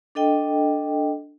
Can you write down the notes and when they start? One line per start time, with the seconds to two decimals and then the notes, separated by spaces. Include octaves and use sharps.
0.15 D4 A4 D#5 G5